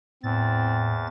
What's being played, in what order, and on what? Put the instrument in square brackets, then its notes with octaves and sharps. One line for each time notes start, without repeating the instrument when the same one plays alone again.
[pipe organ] E2 A6 [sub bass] A2 [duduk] C4